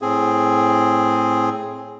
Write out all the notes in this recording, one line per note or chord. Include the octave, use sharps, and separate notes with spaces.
A2 C4 G#4